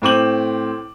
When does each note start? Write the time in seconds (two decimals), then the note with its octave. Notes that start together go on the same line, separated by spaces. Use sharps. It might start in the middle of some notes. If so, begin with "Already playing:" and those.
0.02 A2 C4 D6 F#7